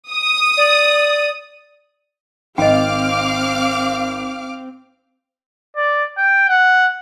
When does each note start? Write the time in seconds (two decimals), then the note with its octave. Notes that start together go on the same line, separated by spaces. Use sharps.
0.11 D#6
0.57 D5
2.58 G#1 C4 D#5 F5 G5 D6 F6
5.76 D5
6.17 G5
6.49 F#5